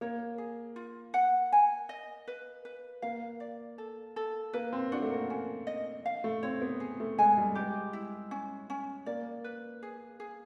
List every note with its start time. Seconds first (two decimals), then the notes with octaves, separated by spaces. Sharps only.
0.01 A#3 C#5
0.38 G#4
0.76 F4
1.14 F#5
1.52 G#5
1.89 D#5
2.28 B4
2.65 B4
3.02 A#3 F5
3.40 D5
3.78 A4
4.16 A4
4.53 A#3 B4
4.73 C4
4.92 D4 F#4
5.02 A3
5.10 A#3
5.30 C#4
5.67 D#5
6.06 F5
6.24 A3
6.43 C4 C#5
6.62 B3
6.80 G#4
7.00 A3
7.18 G#3 G#5
7.38 G3
7.55 G#3 G4
7.93 E4
8.31 C#4
8.70 C#4
9.06 A#3 D5
9.44 B4
9.83 G#4
10.20 G#4